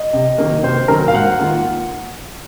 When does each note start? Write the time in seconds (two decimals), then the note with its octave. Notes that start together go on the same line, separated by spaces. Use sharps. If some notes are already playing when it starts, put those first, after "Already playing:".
Already playing: D#5
0.13 C3
0.38 D#3 F#3 A#3
0.63 C3 C5
0.88 D#3 F#3 A#3 A#4
1.08 F5
1.14 G#2 F#5
1.39 D#3 A#3 F4